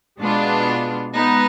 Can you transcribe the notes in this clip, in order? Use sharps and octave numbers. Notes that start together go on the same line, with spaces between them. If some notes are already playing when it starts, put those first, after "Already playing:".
B2 G#3 B3 D4 F4
G#3 B3 D#4